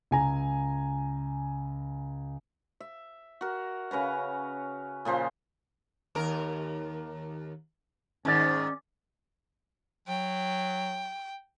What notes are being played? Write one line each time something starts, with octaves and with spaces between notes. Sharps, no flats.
C#2 G#5 A#5
E5
F#4 A#4
C#3 C#4 B4 A#5
A#2 C#3 F3 C5
D#2 A#4
G#2 D#3 C#4 D5
F#3 G5